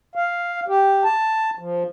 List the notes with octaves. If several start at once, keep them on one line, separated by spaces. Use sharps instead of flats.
F5
G4
A5
F3